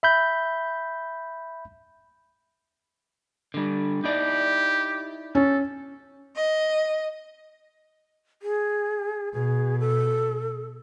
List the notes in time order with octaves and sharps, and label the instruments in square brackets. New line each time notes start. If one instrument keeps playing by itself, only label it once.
[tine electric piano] E5 B5 G6
[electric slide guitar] D3 G3
[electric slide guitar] D#4 E4 D5 [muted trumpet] G4
[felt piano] C#4 [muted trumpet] A4
[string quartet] D#5
[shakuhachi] G#4
[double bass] B2 [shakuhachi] G#4
[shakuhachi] A4